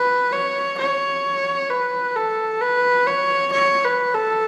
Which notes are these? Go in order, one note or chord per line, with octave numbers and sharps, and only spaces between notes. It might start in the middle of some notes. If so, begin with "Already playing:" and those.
Already playing: B4
C#5
C#5
B4
A4
B4
C#5
C#5
B4
A4